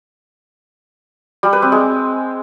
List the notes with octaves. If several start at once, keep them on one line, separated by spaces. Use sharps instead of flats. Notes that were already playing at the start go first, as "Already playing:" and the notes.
G3
B4
C4
G#3